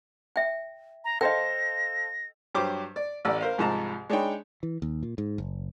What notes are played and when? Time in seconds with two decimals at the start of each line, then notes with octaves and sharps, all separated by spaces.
0.36 E5 G5
1.04 A#5
1.21 A4 C5 D#5 F5 G5 A#6
2.55 G2 F#3 G4 C5 D6
2.96 D5
3.25 A1 D5 F#5 E6
3.41 A#4 C5 F5
3.58 C2 G#2 F3 A5 A#5
4.10 G#3 D4 D#4 C#5 G5 B5
4.63 E3
4.82 D#2
5.03 A#2
5.18 G#2
5.38 F#1